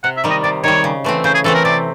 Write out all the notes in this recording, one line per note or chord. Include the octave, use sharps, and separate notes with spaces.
C3 F#5
E5
D#3 G3
D#5
C3 D5
D#3 G3 C#5
C#3
E3 A3 C4
C#3 C5
G#4
E3 A3 C4 A4
A#4
C3 D5